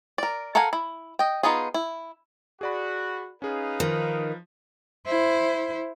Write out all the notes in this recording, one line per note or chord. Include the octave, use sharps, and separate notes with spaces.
A#4 D5
A4 A#4 F5 F#5 G#5
E4
D#5 G5
B3 D#4 F4 G#4
E4
F#4 G#4 D5 B5
C#4 D#4 G#4 B4 F5
D#3 F3
E4 C5